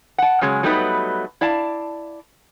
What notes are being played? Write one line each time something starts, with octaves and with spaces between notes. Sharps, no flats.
F#5 A5
C#3 F#3 G#3 C#4
F#3 G3 A3 B3 D#4 B4
E4 D5 F5 A5